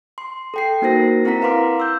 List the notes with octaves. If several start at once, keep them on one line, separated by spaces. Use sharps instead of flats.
C6
A4 G5 C7
A#3 D#4 F#4 A#4 C5 A#6
C4 E4 A#4 F#5 A#5 B6
B4 F5 A#5 C6 D6
E6 G6